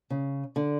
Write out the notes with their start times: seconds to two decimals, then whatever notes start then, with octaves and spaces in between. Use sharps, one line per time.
0.10 C#3
0.56 D3